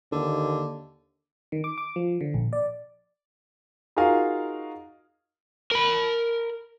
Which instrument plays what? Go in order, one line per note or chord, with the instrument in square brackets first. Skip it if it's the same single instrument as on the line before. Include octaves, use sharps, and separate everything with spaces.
[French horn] D#2 [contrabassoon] D3
[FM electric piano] D#3
D6
D6
F3
D3
A#1
D5
[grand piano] D#4 F4 F#4 G#4 A#4 F5
[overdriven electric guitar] A#4 B5